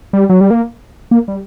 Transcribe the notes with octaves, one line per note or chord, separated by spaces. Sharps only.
G3
F#3
G3
A#3
A#3
G3